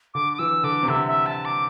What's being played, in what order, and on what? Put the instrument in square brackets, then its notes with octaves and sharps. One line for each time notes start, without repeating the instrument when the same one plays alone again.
[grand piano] D3 [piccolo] D6
[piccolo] D6
[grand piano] E3 [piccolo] E6
[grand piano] D3 [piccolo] D6
[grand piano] C3
[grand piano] D3 [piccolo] E5
[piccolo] E5
A5
D6